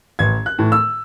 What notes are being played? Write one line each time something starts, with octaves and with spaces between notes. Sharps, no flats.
A1 G#6
F#6
A2 E3
E6